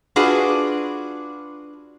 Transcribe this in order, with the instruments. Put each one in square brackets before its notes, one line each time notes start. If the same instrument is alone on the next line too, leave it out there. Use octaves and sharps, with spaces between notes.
[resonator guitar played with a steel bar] D4 F4 F#4 G#4 B4